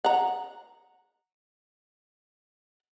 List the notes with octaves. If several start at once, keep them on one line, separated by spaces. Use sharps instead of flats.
F#5 A#5